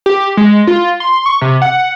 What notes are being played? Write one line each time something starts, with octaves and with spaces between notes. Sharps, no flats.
G4
G#3
F4
C6
C#6
C3
F#5